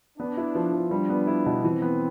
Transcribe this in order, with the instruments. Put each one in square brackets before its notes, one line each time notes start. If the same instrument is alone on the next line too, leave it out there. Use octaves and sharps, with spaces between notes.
[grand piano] B3 [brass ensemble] D4
[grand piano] E4
F3
F3
[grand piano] G3 [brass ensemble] D4
[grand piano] B3
E4
B2
[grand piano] E3 [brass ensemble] C4
[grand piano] B3